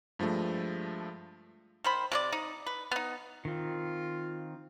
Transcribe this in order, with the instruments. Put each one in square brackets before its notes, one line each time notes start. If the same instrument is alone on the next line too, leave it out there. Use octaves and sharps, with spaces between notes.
[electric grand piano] G2 F3 G#3 A3
[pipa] D#3 C5 B5
C3 C#4 D5
D#4
B4
B3 D#4
[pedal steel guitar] D#3 C4 [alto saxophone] F4